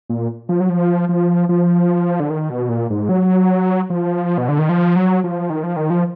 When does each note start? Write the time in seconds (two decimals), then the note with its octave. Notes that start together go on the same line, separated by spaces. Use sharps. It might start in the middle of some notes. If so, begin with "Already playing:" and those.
0.10 A#2
0.49 F3
0.60 F#3
0.69 F3
1.09 F3
1.49 F3
2.20 D3
2.30 D#3
2.50 B2
2.69 A#2
2.90 G#2
3.09 F#3
3.90 F3
4.38 B2
4.49 D3
4.59 D#3
4.69 F3
4.96 F#3
5.24 F3
5.50 D#3
5.63 F3
5.76 D#3
5.90 F3